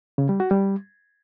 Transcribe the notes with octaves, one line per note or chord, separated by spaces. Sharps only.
C#3
G3
F#4
G3